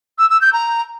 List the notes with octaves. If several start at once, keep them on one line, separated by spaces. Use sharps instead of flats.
E6
E6
G6
A#5